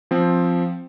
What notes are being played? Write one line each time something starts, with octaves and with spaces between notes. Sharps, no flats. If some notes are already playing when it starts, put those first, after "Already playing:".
F3 C4